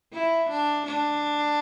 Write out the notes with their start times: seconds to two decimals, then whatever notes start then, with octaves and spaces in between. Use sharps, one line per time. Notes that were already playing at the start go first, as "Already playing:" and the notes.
0.12 E4
0.49 D4
0.86 D4